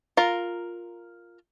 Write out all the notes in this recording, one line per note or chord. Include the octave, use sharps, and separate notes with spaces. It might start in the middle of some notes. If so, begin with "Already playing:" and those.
F4 A#4 A#5